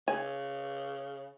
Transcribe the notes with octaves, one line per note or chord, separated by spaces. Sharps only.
C#3 G#5